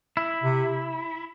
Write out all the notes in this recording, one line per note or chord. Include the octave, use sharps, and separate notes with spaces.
E4
C3